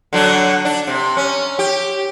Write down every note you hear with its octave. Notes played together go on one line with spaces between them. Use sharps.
D3 F#3 D4
D4
C3
C#4
G4